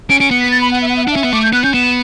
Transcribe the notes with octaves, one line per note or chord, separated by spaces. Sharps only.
C#4 D7
C#4 D7
B3 C#7
B6
A6
B5
F#5
E5
F#5
E5
F#5
D4
C#4 E5
B3
A3 D6
G6
B3 F#6
C#4 G6
B3 E7